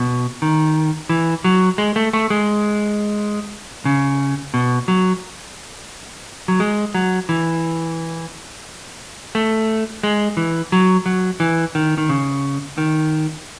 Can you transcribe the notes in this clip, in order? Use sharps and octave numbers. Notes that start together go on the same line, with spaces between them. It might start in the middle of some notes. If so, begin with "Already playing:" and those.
Already playing: B2
D#3
E3
F#3
G#3
A3
A3
G#3
C#3
B2
F#3
F#3
G#3
F#3
E3
A3
G#3
E3
F#3
F#3
E3
D#3
D#3
C#3
D#3